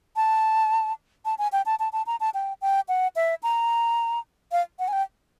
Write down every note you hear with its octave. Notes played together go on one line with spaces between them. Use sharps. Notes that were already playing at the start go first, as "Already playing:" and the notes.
A5
A5
G#5
G5
A5
A5
A5
A#5
A5
G5
G5
F#5
E5
A#5
F5
F#5
G#5
G5